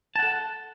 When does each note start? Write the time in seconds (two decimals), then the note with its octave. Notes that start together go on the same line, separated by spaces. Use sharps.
0.16 A5
0.19 F#5
0.23 A4